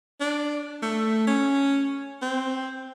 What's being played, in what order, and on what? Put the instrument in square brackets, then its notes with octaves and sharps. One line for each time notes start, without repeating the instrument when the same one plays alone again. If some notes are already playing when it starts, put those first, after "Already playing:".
[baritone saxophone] D4
A3
C#4
C4